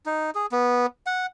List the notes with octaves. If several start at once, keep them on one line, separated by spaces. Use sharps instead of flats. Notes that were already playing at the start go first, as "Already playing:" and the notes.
D#4
G#4
B3
F#5